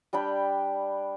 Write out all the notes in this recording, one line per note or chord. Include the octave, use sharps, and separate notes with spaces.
G3 D4 G5 B5